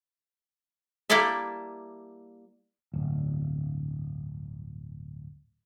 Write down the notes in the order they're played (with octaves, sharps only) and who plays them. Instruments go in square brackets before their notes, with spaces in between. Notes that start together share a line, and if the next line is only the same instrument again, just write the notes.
[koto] G3 A#3 E4 A4 D5 E5
[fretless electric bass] D1 G1